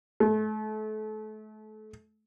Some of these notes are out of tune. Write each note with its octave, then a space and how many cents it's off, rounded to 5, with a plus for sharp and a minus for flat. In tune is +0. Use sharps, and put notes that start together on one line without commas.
A3 -35